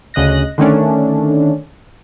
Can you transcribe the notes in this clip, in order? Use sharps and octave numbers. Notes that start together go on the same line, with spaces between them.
D2 C#3 D#5 F#6 A#6
D3 D#3 A3 C#4 D4